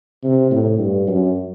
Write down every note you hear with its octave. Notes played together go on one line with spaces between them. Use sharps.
C3
A2
G2
F#2